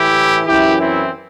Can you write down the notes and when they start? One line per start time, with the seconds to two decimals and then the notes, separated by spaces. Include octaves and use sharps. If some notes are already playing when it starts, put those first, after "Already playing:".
Already playing: A2 E3 E4 G4
0.47 F#2 E3 E4 G4
0.80 C4 E4